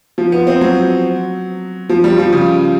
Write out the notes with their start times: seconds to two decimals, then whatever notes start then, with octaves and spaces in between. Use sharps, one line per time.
0.18 F3
0.32 B3
0.47 C4
0.61 F#3
1.90 F3
2.04 G3
2.18 F3
2.33 C#3